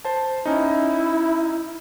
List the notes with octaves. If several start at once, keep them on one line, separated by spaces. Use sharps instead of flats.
C5 A5
C#4 D#4 E4